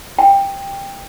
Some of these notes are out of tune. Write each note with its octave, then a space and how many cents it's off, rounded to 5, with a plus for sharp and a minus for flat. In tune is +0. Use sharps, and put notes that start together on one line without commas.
G5 +15